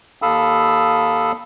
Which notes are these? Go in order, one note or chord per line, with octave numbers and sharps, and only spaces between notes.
D#2 A4 F5 B5 D#6 E6